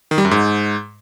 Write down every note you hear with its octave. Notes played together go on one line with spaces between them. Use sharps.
D#3
G3
F#2
G#2